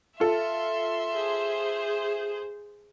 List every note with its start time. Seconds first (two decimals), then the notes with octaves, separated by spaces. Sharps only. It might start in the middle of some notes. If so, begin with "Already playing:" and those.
0.20 F4 A4 E5 C6
1.14 G#4 C5